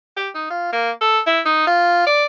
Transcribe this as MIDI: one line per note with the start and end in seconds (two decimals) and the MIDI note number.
0.17 0.29 67
0.35 0.48 63
0.51 0.69 65
0.73 0.90 58
1.01 1.19 69
1.27 1.40 64
1.46 1.67 63
1.67 2.05 65
2.07 2.26 74